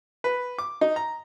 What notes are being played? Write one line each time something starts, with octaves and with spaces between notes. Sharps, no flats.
B4
D6
D#4
A#5